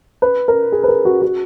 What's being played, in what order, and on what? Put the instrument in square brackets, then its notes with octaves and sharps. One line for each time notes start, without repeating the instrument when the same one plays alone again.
[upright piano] B4
A#4
G#4
B4
A#4
F#4
F#4